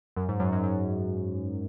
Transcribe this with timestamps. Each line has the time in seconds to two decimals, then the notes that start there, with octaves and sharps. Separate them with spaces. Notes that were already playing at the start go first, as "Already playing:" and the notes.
0.17 F#2
0.29 G#2
0.40 F#2
0.52 F#2
0.63 F#2